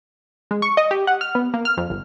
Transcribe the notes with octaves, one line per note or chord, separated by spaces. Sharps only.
G#3
C#6
D#5
G4
F#5
F6
B3
A#3
F6
F2
G1